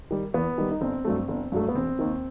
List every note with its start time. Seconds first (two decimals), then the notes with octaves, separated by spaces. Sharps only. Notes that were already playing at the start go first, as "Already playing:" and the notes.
0.11 D#3 G3
0.34 E2 B3
0.58 D#3 G3
0.71 D#4
0.81 G1 C4
1.05 G2 F#3 A3
1.28 G1
1.52 G2 F#3 A3
1.68 B3
1.75 E1 C4
1.99 D#2 D#3